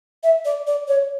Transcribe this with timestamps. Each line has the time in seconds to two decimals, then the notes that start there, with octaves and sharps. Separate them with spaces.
0.23 E5
0.45 D5
0.67 D5
0.88 C#5